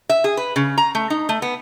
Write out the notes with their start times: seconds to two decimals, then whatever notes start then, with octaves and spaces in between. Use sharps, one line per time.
0.09 E5
0.24 G#4
0.37 B4
0.56 C#3
0.78 A#5
0.95 A3
1.10 D#4
1.29 A3
1.42 B3